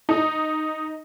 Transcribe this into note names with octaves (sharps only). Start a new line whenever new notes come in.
D#4